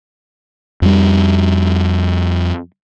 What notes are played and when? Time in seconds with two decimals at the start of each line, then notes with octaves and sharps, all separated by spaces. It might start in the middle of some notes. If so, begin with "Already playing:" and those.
0.82 F2 G3